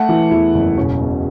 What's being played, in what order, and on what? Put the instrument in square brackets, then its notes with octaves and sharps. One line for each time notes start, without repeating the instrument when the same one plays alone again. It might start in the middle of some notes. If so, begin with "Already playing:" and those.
Already playing: [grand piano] A3 F#5
E3
E2 E4
F#1
E1 C#4
B2